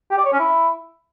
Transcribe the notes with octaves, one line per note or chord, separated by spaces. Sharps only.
G4
D5
C#5
C#4
E4